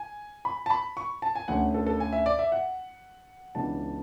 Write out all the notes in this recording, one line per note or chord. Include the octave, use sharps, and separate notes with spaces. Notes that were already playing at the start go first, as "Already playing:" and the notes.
Already playing: G#5
B5
A5
B5
C#6
A5
G#5
D2 D3 A3 C#4 F#5
A4
A4
G#5
E5
D5
E5
F#5
C#2 C#3 E3 B3 D4 A5